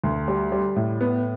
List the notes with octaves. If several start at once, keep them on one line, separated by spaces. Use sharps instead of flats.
D2
G3
G3
A2
B3